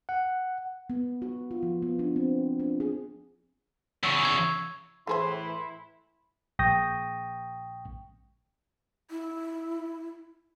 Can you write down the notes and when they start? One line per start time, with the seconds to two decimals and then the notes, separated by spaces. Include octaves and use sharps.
0.09 F#5
0.90 B3
1.22 F#4
1.51 F4
1.63 F3
1.82 B3
1.99 D4
2.16 C4
2.60 D4
2.80 G#4
4.03 E2 C#3 C#6 E6
4.25 G#6
5.07 A2 E3 A3 E4 G#4 C5 C6
6.59 A#1 G5 C#6 D#6 G6 A#6
9.11 E4